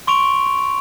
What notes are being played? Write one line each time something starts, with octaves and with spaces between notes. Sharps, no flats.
C6 C#6 D7 F7